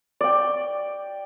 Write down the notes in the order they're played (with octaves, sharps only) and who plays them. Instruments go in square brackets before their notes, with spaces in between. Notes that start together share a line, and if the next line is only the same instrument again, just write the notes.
[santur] D5 G5